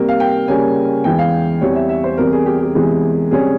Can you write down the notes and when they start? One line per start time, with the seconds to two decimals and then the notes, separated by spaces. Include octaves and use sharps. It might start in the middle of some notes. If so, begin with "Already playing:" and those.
Already playing: C3 G3 A#3
0.09 F5
0.20 G5
0.48 C#3 G3 A#3 C#4 G#5
1.04 E2 E3 G#3 G5
1.19 F5
1.61 E2 E3 G3 C4 C#5
1.76 E5
1.89 E5
2.04 C5
2.18 E2 C3 G3 C4 A#4
2.32 G#4
2.46 G4
2.61 G4
2.75 E2 C3 E3 G#3
3.31 C3 G3 C#4 G#4